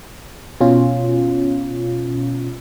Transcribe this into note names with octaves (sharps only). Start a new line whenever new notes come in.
B2 C#4 F4